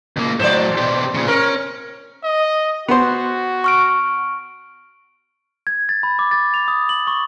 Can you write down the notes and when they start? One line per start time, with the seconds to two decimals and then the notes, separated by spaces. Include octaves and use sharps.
0.17 C#2 A#3
0.40 A2 F#3 C5 D5
0.77 B2 G4
1.15 A#2 C#3
1.28 C#4 A#4
2.23 D#5
2.88 B3 F#4 C5
3.64 C#6 F6 D7
5.67 G#6
5.89 A6
6.03 B5
6.19 D6
6.31 A6
6.54 F7
6.68 D#6
6.89 F#7
7.07 C#6